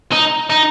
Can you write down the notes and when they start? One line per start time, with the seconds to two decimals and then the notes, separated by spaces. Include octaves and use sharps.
0.12 D#4
0.50 D#4